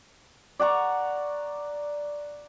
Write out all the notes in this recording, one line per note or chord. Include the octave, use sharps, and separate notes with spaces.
D5 F#5 A#5 C#6